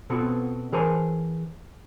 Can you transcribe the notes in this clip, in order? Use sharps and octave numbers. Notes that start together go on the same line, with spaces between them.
B2 B3 C4 F4 F#4 A4
E3 G#4 A#4 C5 G#5 A5